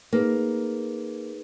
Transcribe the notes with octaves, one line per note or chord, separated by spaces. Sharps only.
A#3 D#4 G#4 B4